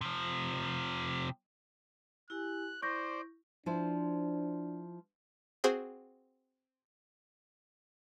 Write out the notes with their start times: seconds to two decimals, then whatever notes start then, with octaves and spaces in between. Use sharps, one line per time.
0.01 C3 F3
2.30 E4 G4 G#5 F#6
2.82 E4 C5 D5 C#6 G6 A#6
3.66 F3 D4 E4 C5
5.64 C4 F#4 G#4 C5